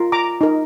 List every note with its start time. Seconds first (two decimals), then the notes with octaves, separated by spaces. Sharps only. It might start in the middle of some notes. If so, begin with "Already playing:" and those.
Already playing: F4 A#4
0.12 A#5 D6
0.41 D#4 A#4